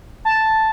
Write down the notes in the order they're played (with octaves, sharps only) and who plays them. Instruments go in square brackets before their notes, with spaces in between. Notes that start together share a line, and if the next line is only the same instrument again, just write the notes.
[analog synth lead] A5